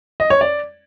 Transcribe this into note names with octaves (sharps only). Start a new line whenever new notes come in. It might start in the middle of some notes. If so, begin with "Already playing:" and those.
D#5
C#5
D5